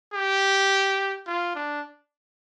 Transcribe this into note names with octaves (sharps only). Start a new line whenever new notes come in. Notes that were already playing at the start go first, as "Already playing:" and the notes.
G4
F4
D4